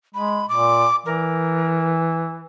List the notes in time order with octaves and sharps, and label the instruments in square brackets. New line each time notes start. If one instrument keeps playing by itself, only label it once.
[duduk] G#3 [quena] B5
[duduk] A#2 [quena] D6
[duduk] E3 [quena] A#4